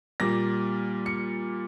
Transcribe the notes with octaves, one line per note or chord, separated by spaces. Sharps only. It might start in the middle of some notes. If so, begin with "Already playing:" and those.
A#2 G3 A#3 A#6
C#7